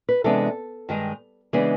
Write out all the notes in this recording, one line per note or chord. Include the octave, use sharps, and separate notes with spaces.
B4
C3 E3 G#3 B3 D4 A4
G2 D#3 G#3
C#3 E3 G#3 B3 D4 G#4